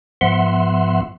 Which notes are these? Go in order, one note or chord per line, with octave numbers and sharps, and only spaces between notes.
G#2 F3 B3 E5 F#5 C6